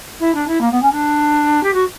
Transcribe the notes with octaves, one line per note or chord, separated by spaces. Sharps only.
E4
D4
E4
A#3
B3
C#4
D4
G4
F#4